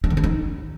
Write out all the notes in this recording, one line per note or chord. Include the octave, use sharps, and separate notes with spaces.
D4
D#3
C#4
D#4